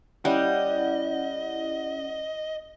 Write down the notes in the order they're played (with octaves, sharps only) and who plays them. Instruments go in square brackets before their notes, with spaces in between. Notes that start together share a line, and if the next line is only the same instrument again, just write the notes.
[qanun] G3 [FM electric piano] C#4 E4 F#5 [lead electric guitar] D#5